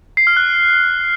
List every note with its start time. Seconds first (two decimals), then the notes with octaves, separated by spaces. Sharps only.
0.17 C7
0.27 F6
0.37 F#6